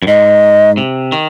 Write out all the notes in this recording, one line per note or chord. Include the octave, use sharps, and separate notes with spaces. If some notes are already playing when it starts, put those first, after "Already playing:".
F#2
G#2 D#5
C3
D#3